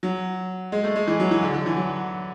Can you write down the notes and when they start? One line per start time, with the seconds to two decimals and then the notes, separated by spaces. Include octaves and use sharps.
0.03 F#3
0.72 G#3
0.84 A3
0.96 G#3
1.07 E3
1.20 F#3
1.31 E3
1.43 D3
1.54 D3
1.66 E3
1.77 F#3